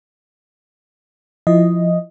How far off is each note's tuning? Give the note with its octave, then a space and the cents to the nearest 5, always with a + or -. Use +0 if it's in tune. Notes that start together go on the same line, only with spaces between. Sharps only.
F3 -5 E4 +0 D#5 +0